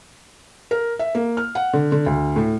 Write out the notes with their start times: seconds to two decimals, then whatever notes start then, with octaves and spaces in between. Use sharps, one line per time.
0.71 A#4
0.99 E5
1.15 A#3
1.37 F6
1.55 F#5
1.73 D3
1.92 D3
2.06 D2
2.36 A2